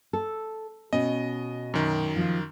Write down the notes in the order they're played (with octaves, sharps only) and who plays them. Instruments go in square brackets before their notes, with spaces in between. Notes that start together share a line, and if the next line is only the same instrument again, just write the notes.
[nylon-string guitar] A4
[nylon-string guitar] B2 C#4 [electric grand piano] D#5
[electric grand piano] F#2 D#3
[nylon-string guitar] F3 F4